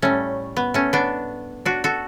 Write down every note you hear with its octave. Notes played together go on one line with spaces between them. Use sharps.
A2 G3 A3 C#4
B3
A3 C#4
B3 D4
D4 F#4
F#4 A4